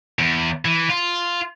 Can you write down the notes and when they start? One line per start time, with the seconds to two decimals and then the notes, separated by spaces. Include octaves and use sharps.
0.19 E2
0.65 E3
0.90 F4